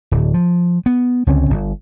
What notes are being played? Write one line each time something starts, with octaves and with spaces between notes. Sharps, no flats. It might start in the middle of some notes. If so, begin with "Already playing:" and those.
D1
F3
B3
C#2 D3 C4 C#4
G1